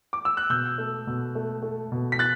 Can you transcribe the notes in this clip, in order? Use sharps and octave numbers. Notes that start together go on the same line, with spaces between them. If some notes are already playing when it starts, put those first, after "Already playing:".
D6
E6
F#6
B2 E6 G6
A3
B2
A3
A3
B2
B6
F#6 A6